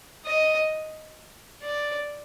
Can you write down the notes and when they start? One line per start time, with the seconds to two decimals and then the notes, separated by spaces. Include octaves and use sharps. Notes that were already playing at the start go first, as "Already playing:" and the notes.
0.26 D#5
1.62 D5